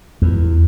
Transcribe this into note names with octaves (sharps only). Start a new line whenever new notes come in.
E2